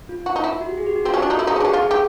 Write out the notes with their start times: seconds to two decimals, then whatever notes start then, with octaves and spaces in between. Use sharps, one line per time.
0.09 F4
0.26 F#4
0.36 D#4
0.44 E4
0.61 F#4
0.69 G4
0.78 G#4
0.86 G4
0.96 F#4
1.05 C4 F4
1.14 C#4
1.18 D4 F#4
1.30 D#4
1.37 E4 A4
1.47 D#4
1.51 C#4 G#4
1.61 D4
1.65 C#4 G4
1.73 F4
1.83 G#4
1.91 G4